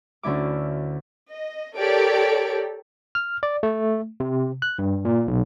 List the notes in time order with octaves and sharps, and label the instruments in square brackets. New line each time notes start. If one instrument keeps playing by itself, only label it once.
[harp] D2 D3 C#4 E4 D6
[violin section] D#5
G4 A4 A#4 C#5 D5 D7
[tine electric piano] F6
D5
A3
C3
F#6
G2
A#2
B1